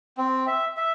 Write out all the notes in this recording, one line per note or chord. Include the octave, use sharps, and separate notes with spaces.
C4
E5
E5